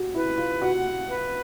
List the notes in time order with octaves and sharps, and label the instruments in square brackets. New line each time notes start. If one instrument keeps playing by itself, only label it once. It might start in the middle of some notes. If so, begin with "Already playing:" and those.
Already playing: [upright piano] F#4 G4
[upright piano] E4 [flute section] B4
[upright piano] F4
[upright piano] F#4 [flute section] F#5
[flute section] B4